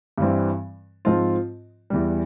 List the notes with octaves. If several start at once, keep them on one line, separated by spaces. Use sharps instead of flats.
G2 E3 G3 C4
G#2 F3 C4 F4
E2 E3 G3